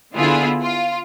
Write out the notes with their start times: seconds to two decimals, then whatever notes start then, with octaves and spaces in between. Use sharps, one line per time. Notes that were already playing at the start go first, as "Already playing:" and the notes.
0.15 D3 B3 E4 F4 G#4
0.62 F4